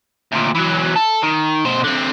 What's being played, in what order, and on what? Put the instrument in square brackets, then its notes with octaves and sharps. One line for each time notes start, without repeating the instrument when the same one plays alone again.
[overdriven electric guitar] D2 A#2
E3 F#3
A4
D#3
B2 C5
D3 C4